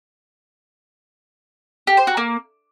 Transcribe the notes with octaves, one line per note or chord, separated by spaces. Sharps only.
G4
C5
F#4
A#3